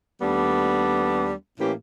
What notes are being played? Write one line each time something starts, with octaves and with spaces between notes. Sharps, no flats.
D#2 G3 A3 B3 D4
A2 E3 A#3 C#4 G4